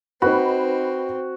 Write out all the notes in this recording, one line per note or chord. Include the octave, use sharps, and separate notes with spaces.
C4 D#4 F#4 B4 B5